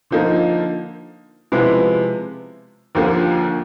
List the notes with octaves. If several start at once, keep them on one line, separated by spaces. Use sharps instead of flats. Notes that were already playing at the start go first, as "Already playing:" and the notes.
D3 F3 A#3 D#4
C3 F3 G#3 B3 E4
D#2 D3 F3 A#3